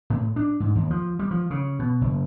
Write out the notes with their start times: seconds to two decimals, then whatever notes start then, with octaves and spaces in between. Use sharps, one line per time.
0.10 A2
0.36 D4
0.60 G#2
0.75 D#2
0.91 F3
1.19 G3
1.31 F3
1.50 C#3
1.79 B2
2.01 F#1